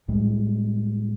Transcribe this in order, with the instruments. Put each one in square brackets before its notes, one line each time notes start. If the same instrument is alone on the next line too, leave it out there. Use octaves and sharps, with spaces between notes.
[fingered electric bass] C2 A2 G3 G#3